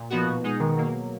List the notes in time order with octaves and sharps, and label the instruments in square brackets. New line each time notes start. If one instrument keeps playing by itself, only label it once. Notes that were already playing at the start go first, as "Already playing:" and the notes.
Already playing: [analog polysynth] A#2
F3 B3 D#4 F#4
B2
G#3 D#4 G#4
[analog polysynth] B2 [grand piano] D#3
[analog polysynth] F#3 A#3